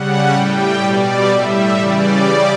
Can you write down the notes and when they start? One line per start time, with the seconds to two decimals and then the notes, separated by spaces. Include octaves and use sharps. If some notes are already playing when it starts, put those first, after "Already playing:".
Already playing: C#3 G3 F#5
0.32 A2 G3 G5
0.80 B2 G3 D5
1.28 A2 G3 E5
1.78 C#3 E3 G3 D5
2.25 C#3 G3